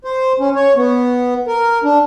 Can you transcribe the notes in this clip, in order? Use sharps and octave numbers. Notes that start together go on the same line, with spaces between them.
C5
C#4
C#5
B3
A#4
D4